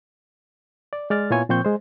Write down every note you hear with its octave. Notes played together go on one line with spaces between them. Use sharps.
D5
G#3 D5 F6 A6
A#2 B3 E4 F4 C#5 G#5
A#2 F3 C4 C5 C#6 G6
G#3 C5